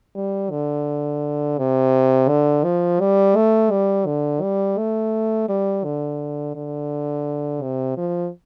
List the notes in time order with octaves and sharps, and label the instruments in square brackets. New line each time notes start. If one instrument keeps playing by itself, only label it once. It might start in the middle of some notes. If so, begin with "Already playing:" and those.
[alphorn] G3
D3
C3
D3
F3
G3
A3
G3
D3
G3
A3
G3
D3
D3
C3
F3